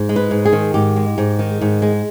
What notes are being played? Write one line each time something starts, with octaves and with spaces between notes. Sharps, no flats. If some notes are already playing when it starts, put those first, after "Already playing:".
Already playing: G#2
G#3
B4
G#2
G#4
D#3
G#2 G4
G#3
G#2
D#3
G#2
G#3